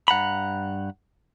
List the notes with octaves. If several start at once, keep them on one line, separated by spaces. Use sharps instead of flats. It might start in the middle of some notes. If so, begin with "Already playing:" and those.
G2 F#5 A#5 B5